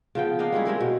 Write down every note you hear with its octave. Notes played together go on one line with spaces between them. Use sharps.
C#3 F3 B3 G5
A#3 D4 D#5 F5
G3 G#3 C#4 E4
G#3 C4 A#4 C#5
B2